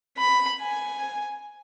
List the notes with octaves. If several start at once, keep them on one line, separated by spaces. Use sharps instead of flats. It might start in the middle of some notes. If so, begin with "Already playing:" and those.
B5
G#5